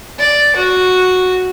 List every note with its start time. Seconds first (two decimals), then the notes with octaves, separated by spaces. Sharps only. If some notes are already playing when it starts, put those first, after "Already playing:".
0.19 D5
0.55 F#4